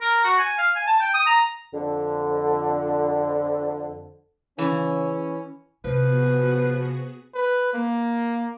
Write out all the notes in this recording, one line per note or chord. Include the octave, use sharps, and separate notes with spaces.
A#4
F#4
G#5
F5
G#5
A5
G5
D#6
A#5
F2 D3
C#3 E3 C#4
C3 F3 B3 F#4 G#4 B4
B4
A#3